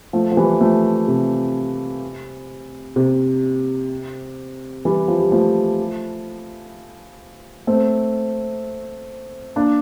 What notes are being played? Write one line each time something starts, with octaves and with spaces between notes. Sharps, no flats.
F3 A3
F3
E3 G3
F3 A3
C3
C3
E3 G3
F3
G3
F3 A3
A3 C4
A#3 D4